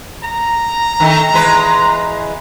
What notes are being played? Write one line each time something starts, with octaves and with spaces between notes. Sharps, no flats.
A#5
D#3 A3 D#4
E2 G#3 B4